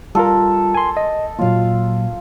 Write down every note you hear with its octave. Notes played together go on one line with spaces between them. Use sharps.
G3 F4 A4 A#4
G#5 C6
D#5
A#2 F#3 A#3 F4 F5